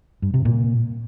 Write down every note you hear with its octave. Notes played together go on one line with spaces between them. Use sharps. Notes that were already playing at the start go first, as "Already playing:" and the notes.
G2
C3
A#2